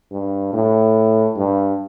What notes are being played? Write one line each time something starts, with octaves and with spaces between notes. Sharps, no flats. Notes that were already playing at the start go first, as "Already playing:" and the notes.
G2
A2
G2